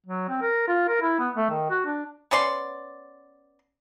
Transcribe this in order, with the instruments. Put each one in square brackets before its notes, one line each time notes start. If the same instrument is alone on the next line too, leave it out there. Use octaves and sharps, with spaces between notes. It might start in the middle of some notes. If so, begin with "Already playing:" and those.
[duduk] F#3
C4
A#4
F4
A#4
E4
B3
A3
D#3
F#4
D4
[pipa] B3 C#4 D5 C6